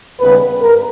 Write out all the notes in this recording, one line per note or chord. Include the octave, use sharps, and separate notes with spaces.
D#2 C#3 G3 B3 B4
G2 A#4